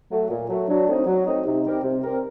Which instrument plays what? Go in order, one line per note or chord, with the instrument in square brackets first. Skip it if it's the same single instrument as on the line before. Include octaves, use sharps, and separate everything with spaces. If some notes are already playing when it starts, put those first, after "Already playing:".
[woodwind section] F#3 A3
A#2
F#3 A3
[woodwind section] F#3 [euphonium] D4
[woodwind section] A3 C4 D#4
F#3
A3 C4 D#4
[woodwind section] C3 [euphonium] D#4
[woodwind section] G3 C4 G4 A#4
C3
G3 C4 G4 A#4